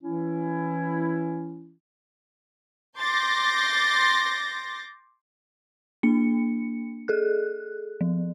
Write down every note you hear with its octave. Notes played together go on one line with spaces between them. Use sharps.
E3 C#4 E4
C6 D6 G6 A6 A#6
A#3 D4 C#7
G#4 A4 F#6
F3